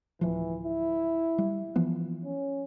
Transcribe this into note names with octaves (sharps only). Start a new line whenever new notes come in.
D1 E3 F3
E4
G3
E3 F3 B3
C#4